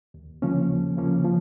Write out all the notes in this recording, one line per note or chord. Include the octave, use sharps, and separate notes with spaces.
D#2
C#3 F3 A#3 C#4
D#2
C#3 F3 A#3 C#4
F3